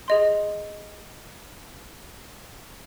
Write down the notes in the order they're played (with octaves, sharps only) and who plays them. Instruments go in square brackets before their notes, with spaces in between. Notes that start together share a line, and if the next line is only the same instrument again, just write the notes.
[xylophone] G#4 D#5 C6